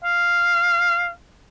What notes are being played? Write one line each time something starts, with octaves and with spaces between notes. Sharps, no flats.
F5